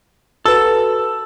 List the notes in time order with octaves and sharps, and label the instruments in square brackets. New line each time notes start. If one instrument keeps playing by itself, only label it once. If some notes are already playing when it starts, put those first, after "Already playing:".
[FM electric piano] F#4 B4 [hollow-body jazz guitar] A4 [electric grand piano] E6